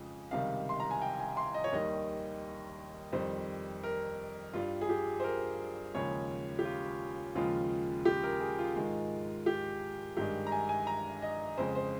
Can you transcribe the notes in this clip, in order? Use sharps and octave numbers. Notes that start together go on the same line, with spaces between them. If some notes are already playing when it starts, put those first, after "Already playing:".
Already playing: F2 C#3 F3 G#3
C#2 C3 D#3 G3 F5
C6
A#5
G#5
G5
G#5
C6
D#5
C#5
D#2 D#3 G3 D#5
F2 D#3 G3 C5
A#4
G2 G3 F4
G#4
G4
C5
A#4
D#2 C#3 F3 G#3 C#5
G4
F4
D#2 C#3 F3 G#3 F4
G4
A#4
G#4
F4
G#2 D#3 G#3
G4
G2 D#3 G#3 G4
A#5
G#5
G#5
A#5
D#5
F2 C#3 G#3 C5
C5